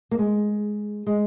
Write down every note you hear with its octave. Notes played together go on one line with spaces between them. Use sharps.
A#3
G#3
G#3